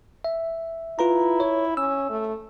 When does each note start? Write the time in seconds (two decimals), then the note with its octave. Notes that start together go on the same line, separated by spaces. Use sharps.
0.24 E5
0.99 E4 F4 B4 A#5
1.40 C#5
1.77 C#4 E6
2.10 A3